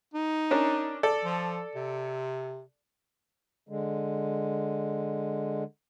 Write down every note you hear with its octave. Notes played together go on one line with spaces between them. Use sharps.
D#4
C#4 D4 A#4
A4 D5
F3
C3
D3 G#3